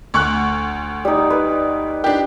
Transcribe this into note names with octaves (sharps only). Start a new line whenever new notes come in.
D2 C#6 F#6
G3 D#4
B4
D4 G4